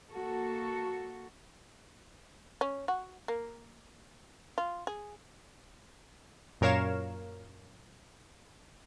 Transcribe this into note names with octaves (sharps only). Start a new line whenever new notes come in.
A#3 F#4 A4
C#4
F#4
A#3
F4
G#4
F#2 A#2 A#4 C#5 F5 E7